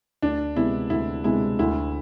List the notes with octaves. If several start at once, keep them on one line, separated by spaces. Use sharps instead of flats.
D2 D4
C3 G#3 B3 E4
D2 E4
C3 G#3 B3 E4
D2 E4